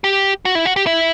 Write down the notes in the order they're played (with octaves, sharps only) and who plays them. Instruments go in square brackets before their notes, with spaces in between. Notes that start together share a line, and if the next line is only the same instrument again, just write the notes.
[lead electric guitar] G4
F#4
E4
F#4
G4
E4